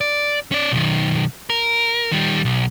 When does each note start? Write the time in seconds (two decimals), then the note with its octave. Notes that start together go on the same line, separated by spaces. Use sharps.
0.01 D5
0.52 C#4 D5
0.71 B1 D#3
1.50 A#4
2.12 D#3 G3
2.45 B1